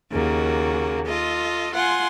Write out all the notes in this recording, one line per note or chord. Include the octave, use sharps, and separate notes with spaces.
D#2 C#3 A#3 F#4
F4 A4 D#5
F4 F#5 G#5 C6